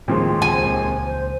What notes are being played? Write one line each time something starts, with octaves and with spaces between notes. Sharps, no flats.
D#2 A2 F3 G#3 A#3 C4 C#4
C#2 A#2 G#5
C5